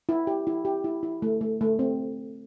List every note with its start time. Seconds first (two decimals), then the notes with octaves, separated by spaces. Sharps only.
0.09 E4
0.27 G4
0.47 E4
0.65 G4
0.84 E4
1.03 E4
1.22 A3
1.41 A3
1.61 A3
1.79 C4